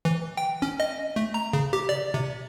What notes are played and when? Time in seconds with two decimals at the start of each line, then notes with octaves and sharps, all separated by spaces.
0.05 E3
0.37 G5
0.62 C#4
0.80 D#5
1.16 A3
1.34 A#5
1.53 C#3
1.73 G4
1.89 D5
2.14 C3